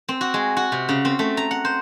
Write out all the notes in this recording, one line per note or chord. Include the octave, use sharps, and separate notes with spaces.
C4
F#4
G#3
F#4
C3
C#3
C4
A3
A#5
F#5
C5